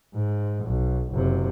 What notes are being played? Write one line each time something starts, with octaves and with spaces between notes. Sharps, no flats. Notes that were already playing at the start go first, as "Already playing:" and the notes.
G#2
B1
F#1 C3